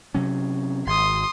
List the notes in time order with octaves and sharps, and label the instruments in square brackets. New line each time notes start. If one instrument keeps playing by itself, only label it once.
[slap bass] C3 F#3 C#4
[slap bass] G#1 [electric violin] C6 D#6